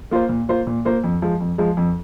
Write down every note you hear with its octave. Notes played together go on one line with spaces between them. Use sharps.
A#3 F4 C5
A#2
A#3 F4 C5
A#2
A#3 F4 C5
F2
F3 G#3
F2
F3 G#3
F2